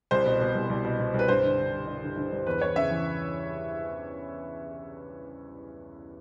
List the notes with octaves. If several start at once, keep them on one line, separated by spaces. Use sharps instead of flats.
C2 C5
B2
B2
C2
C2
B2
B2
C2
B4
G2 C5
D3
D3
G2
G2
D3
D3
G2
E2 B4
E2 C#5
C#3 E5
E3